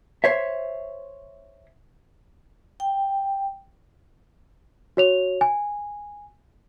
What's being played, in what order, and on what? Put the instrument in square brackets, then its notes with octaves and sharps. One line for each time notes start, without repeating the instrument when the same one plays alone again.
[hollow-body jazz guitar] C5 C#5 E5
[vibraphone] G5
[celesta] F#4 C#5 F7
G#5